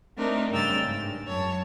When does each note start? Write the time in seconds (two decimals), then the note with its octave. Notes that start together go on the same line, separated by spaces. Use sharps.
0.17 A3 C4 D4 D#4 A#4
0.51 G2 C#3 G5 E6 F6 A6
0.84 G#2
1.26 F#2 C#5 A5